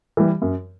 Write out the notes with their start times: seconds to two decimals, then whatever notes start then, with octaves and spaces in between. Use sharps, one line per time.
0.17 E3 G3
0.42 F#2